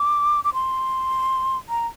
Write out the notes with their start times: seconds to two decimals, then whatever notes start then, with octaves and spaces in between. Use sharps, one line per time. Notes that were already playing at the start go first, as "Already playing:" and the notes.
Already playing: D6
0.44 D6
0.54 C6
1.69 A#5